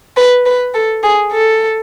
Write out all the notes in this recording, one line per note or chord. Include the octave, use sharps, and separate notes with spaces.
B4
B4
A4
G#4
A4